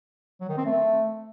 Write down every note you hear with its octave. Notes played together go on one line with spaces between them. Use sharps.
F#3
D#3
C4
A3